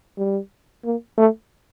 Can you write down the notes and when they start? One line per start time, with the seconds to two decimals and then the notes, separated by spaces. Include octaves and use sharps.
0.18 G3
0.85 A#3
1.18 A3